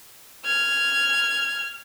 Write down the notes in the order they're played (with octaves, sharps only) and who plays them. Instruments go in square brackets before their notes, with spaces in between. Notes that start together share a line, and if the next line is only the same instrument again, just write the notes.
[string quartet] F6 G#6